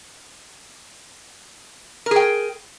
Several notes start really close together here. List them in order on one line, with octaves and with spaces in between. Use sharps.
A#4 G#4 G5